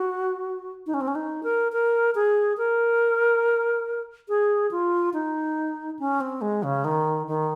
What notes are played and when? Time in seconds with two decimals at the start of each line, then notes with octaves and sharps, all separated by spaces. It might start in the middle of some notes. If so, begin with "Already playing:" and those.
Already playing: F#4
0.87 D#4
0.94 C#4
1.01 C4
1.08 C#4
1.15 D#4
1.43 A#4
1.72 A#4
2.15 G#4
2.58 A#4
4.29 G#4
4.71 F4
5.13 D#4
5.99 C#4
6.21 C4
6.41 G#3
6.63 C#3
6.85 D#3
7.27 D#3